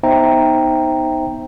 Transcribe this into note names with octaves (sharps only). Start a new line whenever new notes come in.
B3 D#4 C5 E5 G5 A#5